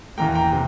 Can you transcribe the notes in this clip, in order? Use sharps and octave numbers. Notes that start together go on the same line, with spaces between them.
E2 E3 A#3 G5 A#5
G5 A#5
C3